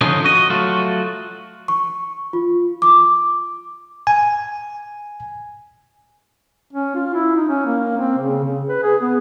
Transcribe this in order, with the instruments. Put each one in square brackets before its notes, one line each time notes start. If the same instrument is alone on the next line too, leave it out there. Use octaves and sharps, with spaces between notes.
[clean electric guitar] D3 F3 B3 C#4 D#4 C5
F#4 D#5
F#3 A3 F4 F#4
[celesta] C#6
F4
D6
[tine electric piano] G#5
[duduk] C#4
F4
E4
D#4
C#4
A#3
C4
C#3
C#3
B4
G#4
B3